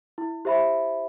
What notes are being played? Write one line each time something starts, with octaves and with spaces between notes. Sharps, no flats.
E4
G4 C5 E5 B5